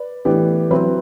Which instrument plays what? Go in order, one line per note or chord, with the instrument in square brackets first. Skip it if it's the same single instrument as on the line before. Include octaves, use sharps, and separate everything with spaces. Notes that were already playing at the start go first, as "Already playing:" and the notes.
Already playing: [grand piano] B4 D5
A2 E3 B3 D4 G4
F#3 C4 E4 B4